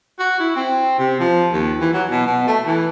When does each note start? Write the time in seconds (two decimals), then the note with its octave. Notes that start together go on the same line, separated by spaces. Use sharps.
0.20 F#4
0.40 E4
0.56 C4
0.99 C3
1.20 F3
1.53 D#2
1.80 E3
1.93 F#3
2.10 B2
2.26 B2
2.47 A3
2.66 E3